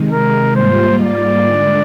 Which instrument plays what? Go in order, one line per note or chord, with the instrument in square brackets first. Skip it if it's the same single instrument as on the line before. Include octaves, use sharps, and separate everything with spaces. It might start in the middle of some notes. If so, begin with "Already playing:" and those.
Already playing: [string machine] C3 D#3 G#3
[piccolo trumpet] A#4
[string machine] G#2 G3 A#3 F4 [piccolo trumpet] C5
[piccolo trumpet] D5
[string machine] D3 G#3 D4